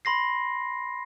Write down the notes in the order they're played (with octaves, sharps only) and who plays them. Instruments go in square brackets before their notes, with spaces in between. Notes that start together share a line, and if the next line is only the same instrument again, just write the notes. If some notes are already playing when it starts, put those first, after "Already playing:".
[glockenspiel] B5 C6 A#6 C7